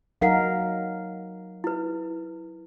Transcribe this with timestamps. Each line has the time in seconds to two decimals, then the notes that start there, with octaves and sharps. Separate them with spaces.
0.22 F#3 D#4 A#4 F5 F#5
1.64 E4 B4